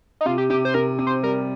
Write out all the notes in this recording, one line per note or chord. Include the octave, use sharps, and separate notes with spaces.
D#4
C3 F4
G4
C3 G4
C5
C3 A#4
C3
C5
G3 A#4